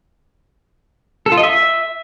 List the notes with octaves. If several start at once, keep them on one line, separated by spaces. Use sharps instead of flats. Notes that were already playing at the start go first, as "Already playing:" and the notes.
A4
F4
D#5
E5